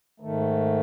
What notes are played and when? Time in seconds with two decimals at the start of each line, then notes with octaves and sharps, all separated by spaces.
0.20 G#2 D#3 A3